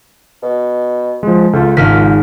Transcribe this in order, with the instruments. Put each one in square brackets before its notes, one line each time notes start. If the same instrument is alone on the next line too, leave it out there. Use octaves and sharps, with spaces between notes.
[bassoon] B2
[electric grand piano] F3 G#3
[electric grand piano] C#2 F4 [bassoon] A3
[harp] G#1 F6 B6 [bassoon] A#3